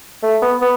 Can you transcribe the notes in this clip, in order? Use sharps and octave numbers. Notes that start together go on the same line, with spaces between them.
A3
B3
B3